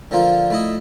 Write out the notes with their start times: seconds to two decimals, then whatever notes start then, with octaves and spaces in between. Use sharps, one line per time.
0.11 D3 F3 A#3 F4
0.50 A3 E4 D#5